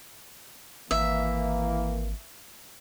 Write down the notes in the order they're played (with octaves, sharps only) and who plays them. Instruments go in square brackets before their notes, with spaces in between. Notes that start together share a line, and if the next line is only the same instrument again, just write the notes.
[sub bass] G#1 [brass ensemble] E3 A#3 [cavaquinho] E5